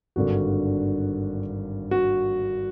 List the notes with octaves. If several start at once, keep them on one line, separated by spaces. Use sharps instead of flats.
G#1 G2 D3 F#4
F#4